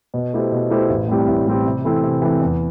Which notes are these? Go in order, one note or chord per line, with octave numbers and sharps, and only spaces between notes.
B2
A3 E4 G4 C5
B2
A3 E4 G4 C5
A1
A2 G3 C4 G4
A1
A2 G3 C4 G4
C3
E3 A3 C4 E4
C3
E3 A3 C4 E4
E2